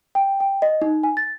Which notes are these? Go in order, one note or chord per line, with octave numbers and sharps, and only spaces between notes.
G5
G5
D#5
D#4
G#5
A6